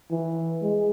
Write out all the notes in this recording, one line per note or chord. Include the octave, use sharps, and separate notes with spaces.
E3
G#3